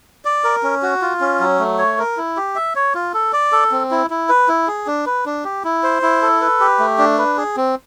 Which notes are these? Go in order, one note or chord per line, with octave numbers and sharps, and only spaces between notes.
D5
A#4
C#4
F#4
F4
C#4
F#3
A3
C#5
A#4
E4
G4
E5
C#5
F4
A4
D5
A4
C4
E4
E4
B4
E4
G#4
D4
B4
D4
G4
E4
C5
E4
A4
B4
G4
A3
D4
B4
G#4
C4